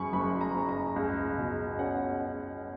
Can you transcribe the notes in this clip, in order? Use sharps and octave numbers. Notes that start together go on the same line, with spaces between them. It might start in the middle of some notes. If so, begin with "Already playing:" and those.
Already playing: F#2 C#3 B5 C#6
F#1 B5
A#5
F#1
A#5
C#2
B2
C#4 F#5